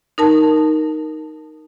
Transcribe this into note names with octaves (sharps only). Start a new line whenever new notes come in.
D#4 A#4 A5